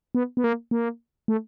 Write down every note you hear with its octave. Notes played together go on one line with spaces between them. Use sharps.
B3
B3
A#3
A#3
A3